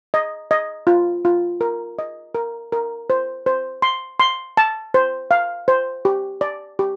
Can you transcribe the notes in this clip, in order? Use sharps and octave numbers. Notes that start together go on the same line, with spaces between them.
D#5
D#5
F4
F4
A#4
D#5
A#4
A#4
C5
C5
C6
C6
A5
C5
F5
C5
G4
D5
G4